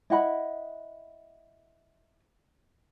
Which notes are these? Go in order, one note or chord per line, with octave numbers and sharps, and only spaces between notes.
E4 D#5 F#5 B5